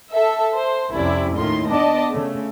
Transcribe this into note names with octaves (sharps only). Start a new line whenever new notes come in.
A4 E5
C5
C2 F2 C3 C#4 E4 D5
D#2 A2 D#3 F4 C6
B3 D4 D5 D#5 A5
C#3 A3